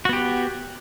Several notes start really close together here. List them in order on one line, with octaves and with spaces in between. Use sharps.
F#4 B3 G4